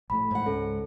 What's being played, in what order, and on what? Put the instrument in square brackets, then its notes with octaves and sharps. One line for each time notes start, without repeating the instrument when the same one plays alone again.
[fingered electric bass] A#1 A2 A3 [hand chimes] B5
[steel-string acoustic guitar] G#2 F#5
[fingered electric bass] C#2 C#4 [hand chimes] A4